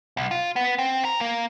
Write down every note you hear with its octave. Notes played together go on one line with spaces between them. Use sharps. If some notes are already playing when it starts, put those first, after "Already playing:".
B1
F4
B3
C4
A#4
A#3